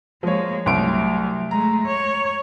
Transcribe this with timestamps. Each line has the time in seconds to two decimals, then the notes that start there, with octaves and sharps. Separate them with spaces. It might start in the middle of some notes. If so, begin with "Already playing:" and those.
0.23 F3 G#3 A#3 C#5
0.66 C2 F#3 A3 C6 D7
1.51 G#3 A3 A#5
1.86 C#5